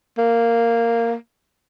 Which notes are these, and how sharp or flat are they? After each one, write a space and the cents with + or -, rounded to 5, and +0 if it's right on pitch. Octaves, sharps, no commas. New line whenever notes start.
A#3 -10